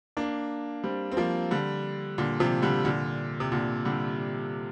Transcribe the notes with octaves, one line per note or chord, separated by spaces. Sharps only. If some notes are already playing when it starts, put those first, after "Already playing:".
A#3 D4
G3 C4
C4
F3 A#3
D3 G3
A#2 D3
C3 F3
D3 G3
A#2 D3
C3
A#2 D3
D3 G3